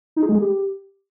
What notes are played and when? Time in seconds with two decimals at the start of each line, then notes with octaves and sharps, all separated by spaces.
0.16 D#4
0.23 G#4
0.29 G#3
0.35 G#4
0.42 G4